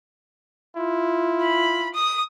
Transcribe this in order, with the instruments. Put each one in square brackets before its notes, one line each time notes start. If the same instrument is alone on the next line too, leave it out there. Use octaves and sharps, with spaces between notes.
[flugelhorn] E4 [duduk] F4
[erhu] B5
D#6